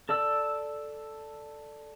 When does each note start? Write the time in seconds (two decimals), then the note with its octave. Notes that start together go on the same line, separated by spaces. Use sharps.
0.09 A4 D5 E6